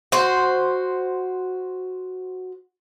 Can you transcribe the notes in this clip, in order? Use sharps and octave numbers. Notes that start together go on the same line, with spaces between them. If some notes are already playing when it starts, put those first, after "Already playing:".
F#4 C5